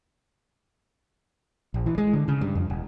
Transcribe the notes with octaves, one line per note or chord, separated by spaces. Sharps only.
A#1
E3
G#3
D3
C#3
G2
F2
E1